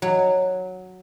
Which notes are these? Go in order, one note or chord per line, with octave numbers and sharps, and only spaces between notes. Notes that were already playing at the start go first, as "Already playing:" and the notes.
F#3